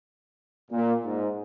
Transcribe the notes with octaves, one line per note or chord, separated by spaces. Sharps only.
A#2
G#2